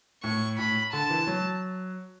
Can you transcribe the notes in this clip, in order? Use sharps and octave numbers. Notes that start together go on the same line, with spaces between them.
A2 C#6
A2 B5
D3 A5
E3
F#3